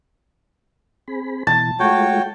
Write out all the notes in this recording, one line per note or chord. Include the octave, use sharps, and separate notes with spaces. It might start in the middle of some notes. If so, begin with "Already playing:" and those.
C4 G#4 B5
B2 E3 A5
G#3 A3 F4 F#4 C#5 G5